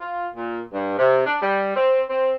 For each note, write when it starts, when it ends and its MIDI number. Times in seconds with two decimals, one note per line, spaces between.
0.01 0.28 65
0.35 0.62 46
0.74 0.96 43
0.98 1.24 48
1.26 1.38 62
1.42 1.73 55
1.76 2.02 60
2.10 2.35 60